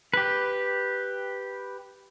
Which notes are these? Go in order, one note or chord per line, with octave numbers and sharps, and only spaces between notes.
G4 B4